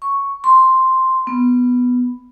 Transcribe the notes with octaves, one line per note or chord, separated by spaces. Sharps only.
C#6
C6
B3